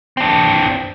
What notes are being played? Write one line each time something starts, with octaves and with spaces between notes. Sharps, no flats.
C4 D4